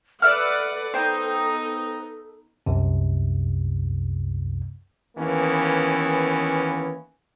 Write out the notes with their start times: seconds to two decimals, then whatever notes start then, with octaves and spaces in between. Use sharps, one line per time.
0.22 A4 B4 D5 E5 F#5 F6
0.94 B3 D#4 C5 G5
2.66 C2 F#2 C3
5.17 D#2 E3 A#3 B3 C#4